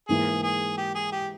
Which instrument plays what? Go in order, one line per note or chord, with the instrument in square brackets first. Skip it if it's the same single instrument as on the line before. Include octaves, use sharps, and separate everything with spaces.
[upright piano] G#2 E3 A#3 [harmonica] G#4
[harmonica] G#4
G4
G#4
G4